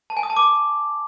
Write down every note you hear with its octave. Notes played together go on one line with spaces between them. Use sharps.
A5
G#5
D#6
A5
D6